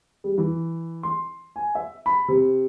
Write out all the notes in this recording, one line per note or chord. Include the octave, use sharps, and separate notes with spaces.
G3
E3
C6
G#5
E5
B5
C3